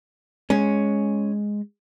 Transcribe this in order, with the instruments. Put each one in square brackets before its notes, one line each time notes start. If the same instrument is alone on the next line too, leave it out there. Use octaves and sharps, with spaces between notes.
[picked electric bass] G#3 [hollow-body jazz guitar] C#4